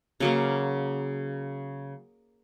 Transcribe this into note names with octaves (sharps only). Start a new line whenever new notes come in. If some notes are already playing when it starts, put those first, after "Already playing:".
C#3 F#3 A#3 F5